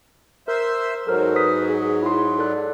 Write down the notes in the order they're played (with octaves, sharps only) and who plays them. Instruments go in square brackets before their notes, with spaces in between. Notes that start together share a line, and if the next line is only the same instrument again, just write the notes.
[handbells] A#4 [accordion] C5 E5
[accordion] G#2 F#3 [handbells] A4 A#4 C5
[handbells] B4 D#6 B6
G#4
E4 C6
A4 D5 F#6